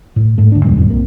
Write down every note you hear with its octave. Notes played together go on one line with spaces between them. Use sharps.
A2
G#2 A3
D2 D4
F2 B2 F3 G#3
D1 F2 A2 G3
C2 A#3 C4